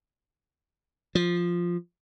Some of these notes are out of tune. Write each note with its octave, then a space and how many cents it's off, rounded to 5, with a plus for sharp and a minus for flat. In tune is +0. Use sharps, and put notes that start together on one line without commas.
F3 +0